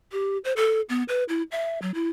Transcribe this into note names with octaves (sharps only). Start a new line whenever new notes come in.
G4
C5
A4
B3
B4
E4
E5
F#3
E4